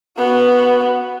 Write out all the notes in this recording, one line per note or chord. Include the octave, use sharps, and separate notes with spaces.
B3 F#4